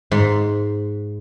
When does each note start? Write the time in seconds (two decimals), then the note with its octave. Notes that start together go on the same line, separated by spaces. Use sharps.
0.11 G#2 C6